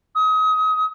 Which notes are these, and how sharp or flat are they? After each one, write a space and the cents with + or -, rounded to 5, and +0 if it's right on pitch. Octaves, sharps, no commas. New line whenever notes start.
D#6 +30